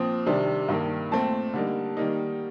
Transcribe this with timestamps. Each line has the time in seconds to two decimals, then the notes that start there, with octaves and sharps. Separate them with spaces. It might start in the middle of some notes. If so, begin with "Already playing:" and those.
Already playing: A#2 F3 C4 D#6
0.26 C3 D#3 G3 D4
0.69 G2 D#3 A#3
1.11 A#2 A3 C4 A5
1.54 D3 G3 A#3 D#4
1.97 D#3 G3 A#3 D#4